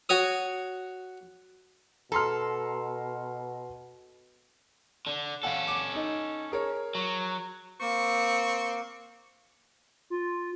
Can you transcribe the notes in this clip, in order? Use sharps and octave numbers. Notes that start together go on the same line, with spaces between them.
F#4 C#5 D#6
B2 A4 A#5 C6 F6
D3
C#4 A4 F5 F#5 G#5
D6
D#4
G#4 A#4 C#5
F#3
A#3 C4 C#6
F4